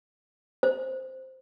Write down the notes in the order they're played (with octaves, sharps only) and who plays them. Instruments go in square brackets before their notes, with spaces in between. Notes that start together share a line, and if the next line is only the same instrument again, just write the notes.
[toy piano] C5